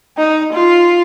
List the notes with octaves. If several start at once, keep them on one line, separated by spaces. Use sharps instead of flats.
D#4
F4